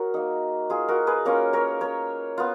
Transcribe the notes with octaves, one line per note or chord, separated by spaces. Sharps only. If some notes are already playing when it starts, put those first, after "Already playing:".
Already playing: F#4 G#4 A#4 C#5 F#5
A#3 D#4
F4 G#4
F#4 A#4
G#4 B4
A#3 C#4 F4 A#4 C#5
A#4 C#5
A#4 C#5
B3 F4